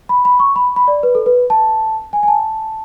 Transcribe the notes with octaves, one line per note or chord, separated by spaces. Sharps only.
B5
B5
C#6
B5
B5
D5
B4
A4
B4
A5
G#5
G#5
A5